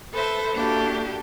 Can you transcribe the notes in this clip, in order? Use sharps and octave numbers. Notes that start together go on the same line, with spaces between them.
A4 B4 C5 E5
A#3 D4 E4 F#4 G4 A4